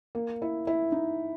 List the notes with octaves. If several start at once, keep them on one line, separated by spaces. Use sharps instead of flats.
A#3
E4
E4
D#4